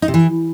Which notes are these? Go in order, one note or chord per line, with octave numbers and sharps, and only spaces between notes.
D#4
C3
E3